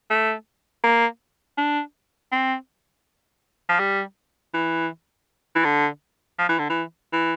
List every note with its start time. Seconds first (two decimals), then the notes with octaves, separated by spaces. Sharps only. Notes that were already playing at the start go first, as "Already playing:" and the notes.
0.10 A3
0.84 A#3
1.58 D4
2.32 C4
3.69 F3
3.79 G3
4.54 E3
5.55 E3
5.64 D3
6.39 F3
6.49 E3
6.59 D3
6.70 E3
7.13 E3